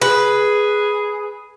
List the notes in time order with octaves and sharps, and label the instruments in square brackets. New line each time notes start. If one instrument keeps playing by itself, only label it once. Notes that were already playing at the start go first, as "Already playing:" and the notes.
[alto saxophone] G#4 [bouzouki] B4